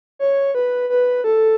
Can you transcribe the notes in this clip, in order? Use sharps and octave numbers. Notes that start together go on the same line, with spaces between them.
C#5
B4
B4
A4